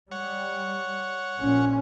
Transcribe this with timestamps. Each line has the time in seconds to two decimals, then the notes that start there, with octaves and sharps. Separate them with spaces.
0.11 G3 C#5 F#5
1.39 A#1 A#2 C#4